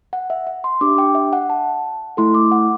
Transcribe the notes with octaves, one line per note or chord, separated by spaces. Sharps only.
F#5
E5
E5
C6
D4 G4 D6
G5
E5
F#5
A5
A3 E4 A4 C6
D6
F#5